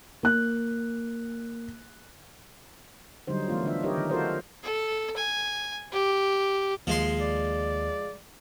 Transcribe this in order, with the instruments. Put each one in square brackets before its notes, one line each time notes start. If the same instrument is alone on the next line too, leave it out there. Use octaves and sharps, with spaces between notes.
[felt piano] A#3 F#6
[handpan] D3 F#3 G3 D#4 C5
E3 A3 B3 F4
D3 D4 E5
D#4 G4 A#4 C#5 D#5
D#3
F4 F#4 A4 A#4 C5 D5
[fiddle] A4
G#5
G4
[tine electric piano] D#2 [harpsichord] F3 G#3 C6
[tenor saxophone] D5